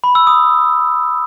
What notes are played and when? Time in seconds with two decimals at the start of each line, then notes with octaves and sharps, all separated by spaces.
0.04 B5
0.15 E6
0.27 D#6